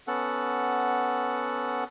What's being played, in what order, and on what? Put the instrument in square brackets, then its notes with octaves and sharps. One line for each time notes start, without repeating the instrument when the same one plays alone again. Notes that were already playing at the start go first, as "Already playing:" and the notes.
[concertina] B3 C#4 A4 F#5